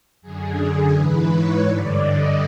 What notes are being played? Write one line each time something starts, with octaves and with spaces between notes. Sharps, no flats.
F#2 D3 G#4
G#2 E3 B4
C#5
G2 D3 D5
D#5